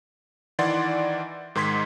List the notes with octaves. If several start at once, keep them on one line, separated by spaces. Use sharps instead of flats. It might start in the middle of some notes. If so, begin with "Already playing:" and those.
D#3 E3 D5 F#5 C6 A6
G#2 D#3 G#3 C6 G#6 B6